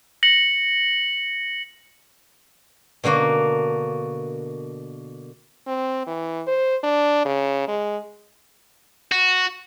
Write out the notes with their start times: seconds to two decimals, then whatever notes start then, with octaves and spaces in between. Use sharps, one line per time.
0.23 A#6 C#7 F#7
3.04 B2 D3 A#3 F#4
5.67 C4
6.07 E3
6.47 C5
6.83 D4
7.25 C#3
7.68 G#3
9.12 F#4